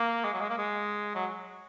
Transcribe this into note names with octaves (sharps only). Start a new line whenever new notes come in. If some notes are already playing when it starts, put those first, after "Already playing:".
Already playing: A#3
G#3
F#3
G#3
A#3
G#3
F#3